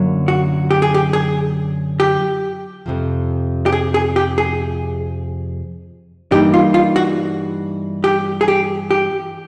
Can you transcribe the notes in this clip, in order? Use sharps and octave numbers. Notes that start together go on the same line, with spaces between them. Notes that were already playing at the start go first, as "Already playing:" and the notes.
Already playing: F#2 D3 F#3 A#3
F#4
G4
G#4
G4
G#4
G4
F2 C3 F3
G4
G#4
G#4
G4
G#4
G2 E3 G3 A#3 D#4 G4
F4
F4
F#4
G4
G#4
G4
G4